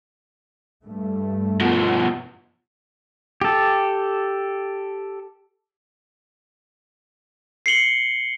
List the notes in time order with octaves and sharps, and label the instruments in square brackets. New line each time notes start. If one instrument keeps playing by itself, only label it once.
[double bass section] G2 A3
[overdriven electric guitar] B2 F3
[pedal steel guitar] G4 A4
[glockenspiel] C7 C#7 F#7 G7